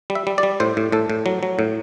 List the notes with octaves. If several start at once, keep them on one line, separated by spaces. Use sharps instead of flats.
G3
E5
G3
D5
G3
A2 C5
A2
A2 A4
A2
F#3
F#3
A2